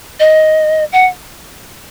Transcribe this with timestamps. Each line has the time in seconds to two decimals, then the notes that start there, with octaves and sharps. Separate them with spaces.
0.20 D#5
0.93 F#5